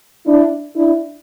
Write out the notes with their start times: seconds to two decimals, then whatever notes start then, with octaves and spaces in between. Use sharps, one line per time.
0.26 D4 E4
0.76 D4 E4